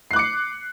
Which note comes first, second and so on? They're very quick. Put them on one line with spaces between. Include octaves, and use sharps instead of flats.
C7 F#6 D6 C#7